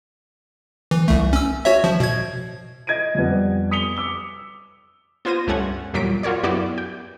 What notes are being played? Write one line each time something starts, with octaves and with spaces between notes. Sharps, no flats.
E3
C2 A3
C#4 E6
F#4 C#5 E5
F3
B2 G#6
D#5 G#6 A#6 D7 D#7
F2 G3 B3
D#6 B6 C#7 F7 G7
D6 E6 G7
B3 F4 C5 G#6 A#6 D#7
C#2 G2 A3 C#4 F#5 G#6
E2 A#2 F#3 G3 B6 D7
F4 F#4 A#4 C#5 D5
F#2 B3 E4 F#4 G4 D5
G5